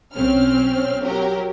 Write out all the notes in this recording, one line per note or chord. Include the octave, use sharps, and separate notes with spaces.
B1 C4 C#4 F6
F#3 G4 A#4